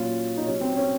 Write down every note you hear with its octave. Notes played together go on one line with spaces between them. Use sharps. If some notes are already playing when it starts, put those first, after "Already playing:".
Already playing: A#2 F#3 C#4 F4
D#4
C3 F#3 C#4
C4
C#4